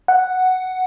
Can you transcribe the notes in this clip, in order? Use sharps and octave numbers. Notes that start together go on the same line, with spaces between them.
F#5